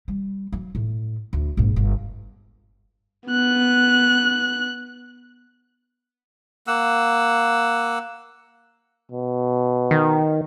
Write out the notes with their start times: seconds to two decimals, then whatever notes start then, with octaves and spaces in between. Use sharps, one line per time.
0.08 G3
0.52 F#3
0.75 A2
1.33 D2
1.57 A#1 G#2
1.76 G1
3.27 B3 F#6
6.67 A#3 F#5 E6
9.12 B2
9.91 D#3